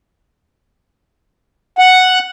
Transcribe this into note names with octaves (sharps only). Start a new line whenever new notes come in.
F#5